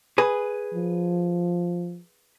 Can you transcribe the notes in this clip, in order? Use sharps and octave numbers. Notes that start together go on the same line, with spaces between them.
G#4 B4
F3